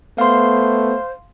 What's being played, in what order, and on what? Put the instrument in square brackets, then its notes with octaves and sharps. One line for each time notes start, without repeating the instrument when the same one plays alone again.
[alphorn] A3 [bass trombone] B3 [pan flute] C5 [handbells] F5 C6